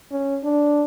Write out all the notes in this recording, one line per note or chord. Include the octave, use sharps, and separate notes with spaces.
C#4
D4